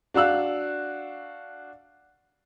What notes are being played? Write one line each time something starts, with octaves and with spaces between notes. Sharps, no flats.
D4 F#4 F5 E6 F#6